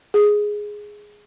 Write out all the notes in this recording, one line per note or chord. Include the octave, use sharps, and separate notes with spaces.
G#4